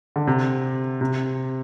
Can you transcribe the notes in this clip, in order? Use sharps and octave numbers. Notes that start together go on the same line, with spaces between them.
D3
C3
C3